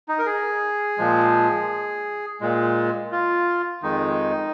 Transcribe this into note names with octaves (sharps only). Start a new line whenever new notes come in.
D#4
A#4
G#4
A#2 F3 G#3
A#2 G#3
F4
F2 D#3 G#3 D#4